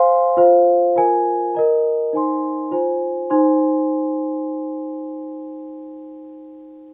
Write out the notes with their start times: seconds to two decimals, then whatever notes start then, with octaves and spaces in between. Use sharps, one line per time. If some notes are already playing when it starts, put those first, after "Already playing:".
Already playing: C5 F5 G#5 C6
0.37 F4 C5 F5
0.96 F4 A#4 G#5
1.55 A#4 D#5 A#5
2.13 D#4 C5 G#5 C6
2.71 F4 C5 G#5
3.30 D#4 C5 G#5 C6